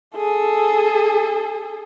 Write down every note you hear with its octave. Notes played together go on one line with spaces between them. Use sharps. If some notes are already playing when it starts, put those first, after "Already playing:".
G#4 A4